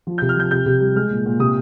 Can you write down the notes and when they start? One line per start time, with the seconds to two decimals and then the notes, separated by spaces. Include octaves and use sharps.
0.07 F3
0.18 C3 G6
0.29 F6
0.36 F3 G6
0.51 C3 G6
0.66 C3
0.80 G3
0.96 G#3 F6
1.10 A#2
1.26 A#2
1.39 C3 D#6